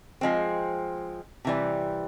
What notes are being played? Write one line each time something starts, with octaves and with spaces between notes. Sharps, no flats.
F3 G#3 C4
C3 E3 G3